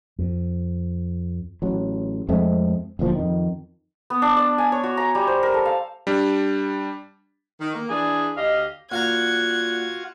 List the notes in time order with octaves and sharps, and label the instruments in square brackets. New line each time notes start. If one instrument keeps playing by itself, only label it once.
[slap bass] F2
[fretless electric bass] A1 F#3
F2 G#3 A3 C4
D1 D2 A#2 F3
F2 D#3
[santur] B3
D4
D5
G#5
C#5
F#4
A#5
G3
C5
A#4
A4
F5
[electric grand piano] G3 D4
[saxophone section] D#3
A#3
[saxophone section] E3 D4 [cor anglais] G#4
[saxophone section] D2 G4 D#5 [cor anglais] F5
[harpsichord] A#2 F5 A#5 [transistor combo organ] F4 F#4 [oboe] F#5 [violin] G#6